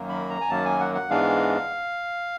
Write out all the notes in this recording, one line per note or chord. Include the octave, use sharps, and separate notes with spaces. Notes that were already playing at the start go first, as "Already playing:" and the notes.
Already playing: F#2 D#3 F#3 A#3
B5
A#5
G#5
F#2 D#3 F#3 A#3 A5
G#5
F#5
F#5
G#2 E3 G#3 B3 D4 F5